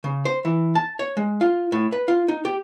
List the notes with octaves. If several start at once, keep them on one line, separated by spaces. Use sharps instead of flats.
C#3
C5
E3
A5
C#5
G#3
F4
A2
B4
F4
D#4
G4